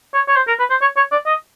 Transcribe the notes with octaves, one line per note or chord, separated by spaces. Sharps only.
C#5
C#5
C5
A#4
B4
C5
C#5
C#5
D5
D#5